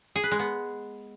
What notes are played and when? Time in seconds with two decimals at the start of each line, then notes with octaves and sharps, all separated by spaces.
0.16 G#4
0.24 B4
0.31 G#3
0.39 B3